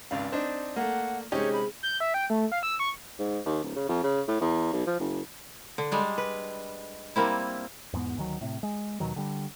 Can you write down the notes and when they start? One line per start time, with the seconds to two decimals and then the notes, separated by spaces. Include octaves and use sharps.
0.11 G#1 C#2 D5 F5
0.32 C4 D4 D#4
0.76 A3 A#3 F#5
1.32 C3 G#3 C#4 D#4 G4 C#5
1.53 B5
1.83 G6
2.00 E5
2.14 G5
2.30 A3
2.52 F5
2.63 E6
2.79 C#6
3.19 G#2
3.46 D#2
3.64 D1
3.76 C#3
3.88 F2
4.03 C#3
4.28 A2
4.41 E2
4.73 B1
4.87 F3
4.99 F#1
5.78 D3
5.92 G3 G#3 D4
6.18 B4
7.16 G3 A#3 C4 E4
7.93 E2 G#2 A#3 B3
8.17 D2 D#3 F#3
8.41 A2 C3
8.63 G#3
9.00 D#2 B2 D#3 F#3
9.16 D3 G3